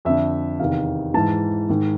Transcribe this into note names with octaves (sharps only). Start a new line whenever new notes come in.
F2 D3 E5
E2 C3 D#3 F5
G#2 E3 A5
G#2 D#3